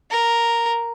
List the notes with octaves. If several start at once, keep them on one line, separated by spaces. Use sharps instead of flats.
A#4